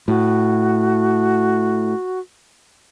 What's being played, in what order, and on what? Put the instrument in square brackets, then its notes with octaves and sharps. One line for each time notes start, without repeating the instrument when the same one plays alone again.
[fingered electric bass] A2 [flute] F#4